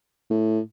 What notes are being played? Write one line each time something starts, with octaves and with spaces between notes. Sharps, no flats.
A2